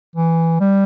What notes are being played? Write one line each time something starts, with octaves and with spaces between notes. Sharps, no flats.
E3
G3